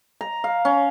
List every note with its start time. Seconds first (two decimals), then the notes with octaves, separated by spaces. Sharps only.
0.21 A#5
0.44 F5
0.65 C#4